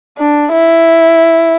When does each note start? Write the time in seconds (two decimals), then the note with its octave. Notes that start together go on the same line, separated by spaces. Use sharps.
0.18 D4
0.53 E4